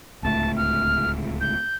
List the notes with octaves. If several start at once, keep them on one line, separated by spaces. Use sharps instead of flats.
D1 C#2 A3 A5
F6
G6